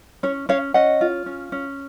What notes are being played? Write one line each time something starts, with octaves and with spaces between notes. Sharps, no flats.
C#4 C#5
C#4 C#5 F5
C#4 D#5 F#5
F4
C#4
C#4